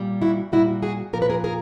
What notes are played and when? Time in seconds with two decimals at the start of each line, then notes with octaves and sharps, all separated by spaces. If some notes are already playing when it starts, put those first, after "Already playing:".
Already playing: A#2 G3
0.22 E4 F#4
0.52 A#2 G3 E4 F#4
0.83 F#4 G#4
1.13 A#2 F3 A#4
1.22 B4
1.29 G#4 A#4
1.44 G#4 A#4